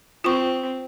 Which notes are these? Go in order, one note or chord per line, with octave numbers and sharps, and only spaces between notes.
C4 F4 C#6